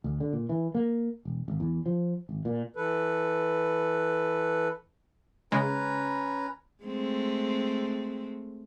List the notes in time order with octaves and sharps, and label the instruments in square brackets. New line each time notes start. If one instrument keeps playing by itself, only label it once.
[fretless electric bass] D2
D3
A#2
E3
A#3
E1
G#1
E2
F3
G#1
A#2
[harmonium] E3 A4 B4
[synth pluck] C#3 G#3 [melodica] C#4 B4 A#5
[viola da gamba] G#3 A3 C4